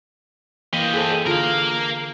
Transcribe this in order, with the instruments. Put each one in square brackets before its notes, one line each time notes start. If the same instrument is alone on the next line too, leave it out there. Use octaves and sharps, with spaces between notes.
[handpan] E3 A#3 [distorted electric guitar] G4 D#5
[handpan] G#4 A4 C5
[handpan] D3 F4 [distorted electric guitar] A#4 F5